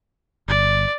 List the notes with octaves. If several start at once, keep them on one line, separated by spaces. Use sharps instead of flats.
G1 D5